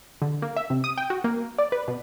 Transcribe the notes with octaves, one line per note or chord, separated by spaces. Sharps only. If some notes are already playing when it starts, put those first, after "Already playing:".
D3
A#3
E5
C3
D#6
G5
F#4
A#3
D5
B4
B2